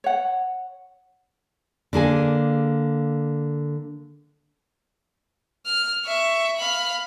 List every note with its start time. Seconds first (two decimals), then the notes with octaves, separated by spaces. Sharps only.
0.04 C#5 F#5
1.93 D3 A#3 G#4 G#5
5.66 F6
6.06 E5 C#6
6.57 F5 B5